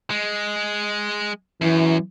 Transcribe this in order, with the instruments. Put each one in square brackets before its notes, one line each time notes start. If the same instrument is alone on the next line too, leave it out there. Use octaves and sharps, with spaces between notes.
[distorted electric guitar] G#3
[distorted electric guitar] F#2 [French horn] E3